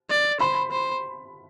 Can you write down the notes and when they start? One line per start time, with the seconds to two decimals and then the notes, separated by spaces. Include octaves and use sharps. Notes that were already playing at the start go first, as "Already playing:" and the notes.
0.10 D5
0.40 C5 B5
0.72 C5